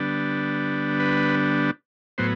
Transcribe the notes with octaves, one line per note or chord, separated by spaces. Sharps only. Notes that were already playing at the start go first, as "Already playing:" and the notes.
Already playing: D3 G3 B3 D4
B4
A2 F#3 B3 C5